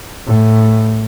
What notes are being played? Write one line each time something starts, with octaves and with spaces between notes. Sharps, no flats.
A2